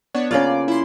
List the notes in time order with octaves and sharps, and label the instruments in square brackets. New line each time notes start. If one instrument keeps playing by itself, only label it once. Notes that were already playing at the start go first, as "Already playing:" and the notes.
[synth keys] B3 D4 C#5
[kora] C#3 A#3 F4 [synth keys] D5
[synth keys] E4 C6